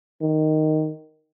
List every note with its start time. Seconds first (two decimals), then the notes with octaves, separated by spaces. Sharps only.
0.21 D#3